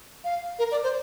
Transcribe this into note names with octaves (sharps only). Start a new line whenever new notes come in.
F5
A#4
D5
C5